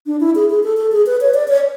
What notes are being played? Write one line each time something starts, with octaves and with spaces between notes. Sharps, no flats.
D4
E4
G#4
G#4
A4
A4
G#4
B4
C#5
D5
C#5